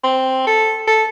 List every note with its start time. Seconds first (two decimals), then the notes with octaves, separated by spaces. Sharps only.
0.04 C4
0.47 A4
0.87 A4